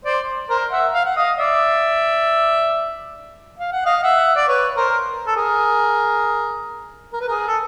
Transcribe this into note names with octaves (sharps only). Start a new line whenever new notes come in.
C5 D5
A#4 C5
E5 F#5
F5
F#5
D#5 F5
D5 E5
F5
F#5
D#5 F5
E5 F#5
D5
B4 C#5
A#4 C5
A4
G#4 A#4
A#4
B4
G#4 A#4
A4